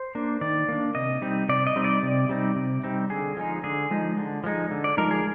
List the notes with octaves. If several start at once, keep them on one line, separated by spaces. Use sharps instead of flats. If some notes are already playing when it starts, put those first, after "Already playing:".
Already playing: C5
A#3 D4
D#3 D5
A#3 D4
C3 D#5
G3 C4 D#4
C3 D5
D#5
G3 C4 D#4
D5
C3
G3 C4 D#4
C3
G3 C4 D#4
D3 G#4
F3 G#3 D#4
D3 G#4
F3 G#3 D#4
D3
F3 G#3 D#4
D3
D5
F3 G#3 D#4 A#4
G#4